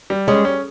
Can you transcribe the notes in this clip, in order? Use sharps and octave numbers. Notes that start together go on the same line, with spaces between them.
G3
G#3 C#4
C#4